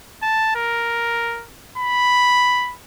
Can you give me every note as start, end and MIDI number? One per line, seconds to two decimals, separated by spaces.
0.23 0.51 81
0.55 1.46 70
1.78 2.75 83